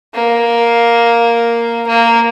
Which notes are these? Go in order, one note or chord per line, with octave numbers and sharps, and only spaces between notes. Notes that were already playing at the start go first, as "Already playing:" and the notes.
A#3
A#3